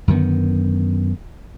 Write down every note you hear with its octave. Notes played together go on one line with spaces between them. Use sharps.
F#2 D3 D#3 B3